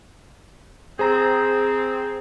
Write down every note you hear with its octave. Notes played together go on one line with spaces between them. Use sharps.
C4 G#4 C5 A#5